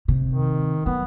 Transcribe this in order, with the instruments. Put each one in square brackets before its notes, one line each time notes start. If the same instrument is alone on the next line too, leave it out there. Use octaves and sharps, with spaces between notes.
[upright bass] C3
[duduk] D#3
[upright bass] F#3 [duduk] B3